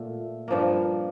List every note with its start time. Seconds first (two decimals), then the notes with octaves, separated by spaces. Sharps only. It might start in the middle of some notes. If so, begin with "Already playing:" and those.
Already playing: A#2 A3
0.48 G2 F3 A#3